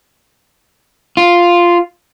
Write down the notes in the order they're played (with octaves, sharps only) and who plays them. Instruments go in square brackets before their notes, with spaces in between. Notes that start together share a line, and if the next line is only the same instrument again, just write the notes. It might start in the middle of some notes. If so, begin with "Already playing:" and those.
[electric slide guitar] F4